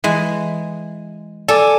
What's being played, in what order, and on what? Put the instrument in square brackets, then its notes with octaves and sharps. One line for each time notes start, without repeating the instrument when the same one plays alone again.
[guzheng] E3 G#3
[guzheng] A4 [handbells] D5 G#5 D6